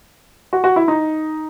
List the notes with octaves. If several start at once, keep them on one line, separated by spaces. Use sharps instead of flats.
F#4
F#4
E4
D#4